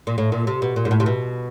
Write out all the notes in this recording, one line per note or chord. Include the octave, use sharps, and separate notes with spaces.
A#2
A2
A#2
C3
B2
A#2
G#2
A2
C3
B2